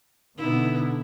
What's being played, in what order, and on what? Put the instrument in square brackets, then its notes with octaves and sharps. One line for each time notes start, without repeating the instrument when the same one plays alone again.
[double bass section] B2 D3 [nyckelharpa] B3 E4 [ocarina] D#4